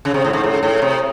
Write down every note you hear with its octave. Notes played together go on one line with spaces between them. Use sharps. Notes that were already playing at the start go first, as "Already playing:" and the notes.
C#3
C3
A2
G#2
A2
A2
C3